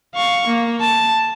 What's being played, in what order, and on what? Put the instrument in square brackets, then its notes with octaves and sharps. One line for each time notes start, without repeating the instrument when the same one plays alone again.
[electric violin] F5 C#6
A#3
A5